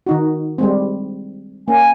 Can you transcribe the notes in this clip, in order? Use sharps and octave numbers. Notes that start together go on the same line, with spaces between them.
D#3 D#4 F#4
G3 G#3 C4
A#3 C#4 G#5